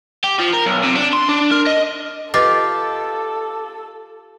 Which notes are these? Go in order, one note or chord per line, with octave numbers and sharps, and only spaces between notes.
G4
F3
A#4
B1
C3
D4
C6
D4
A#4
D#5
F4 G4 A4 B4 D#5 D6 A6